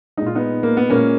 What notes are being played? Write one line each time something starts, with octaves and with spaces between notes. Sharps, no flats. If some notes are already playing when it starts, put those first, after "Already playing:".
A#2 G#3 D#4 F4
B3 D#4
A#3
B3
A#2 G#3 A#3 C#4